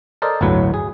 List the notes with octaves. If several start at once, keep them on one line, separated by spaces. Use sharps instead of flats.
A4 A#4 C5 D5 D#5
G1 D2 A2 F#3 B4
G#4